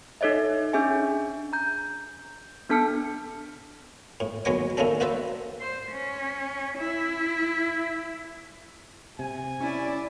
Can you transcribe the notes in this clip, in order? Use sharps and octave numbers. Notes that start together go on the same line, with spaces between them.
D#4 A4 C#5 D#5 E5
C#4 D4 G#4 E5 G#5
A#5 G6
B3 D4 A4 A5 F6 C#7
A2
D#2 F#3 G#3 B3 C#5 D6
C3 D#3 A#3 C#4 D4 A4
A#3 F#4 B4 C5 D5 E5
C5
C#4
E4
C3 G#5
C#4 E4 D5